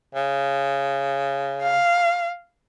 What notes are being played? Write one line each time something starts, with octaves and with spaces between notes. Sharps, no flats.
C#3
F5